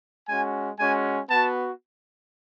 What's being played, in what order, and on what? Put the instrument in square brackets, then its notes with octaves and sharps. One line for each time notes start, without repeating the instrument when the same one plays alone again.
[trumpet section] G#3 C#4 F#4 G#5
G#3 C#4 F#4 G#5
B3 F#4 A5